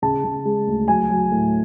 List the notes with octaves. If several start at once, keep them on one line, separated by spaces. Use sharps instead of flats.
C#3 A5
C#3
G#3
D2
F#3 G#5
F#3
A2